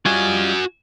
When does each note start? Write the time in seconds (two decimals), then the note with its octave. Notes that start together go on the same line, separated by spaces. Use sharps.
0.06 G3 F4 F#4 D#5 G#5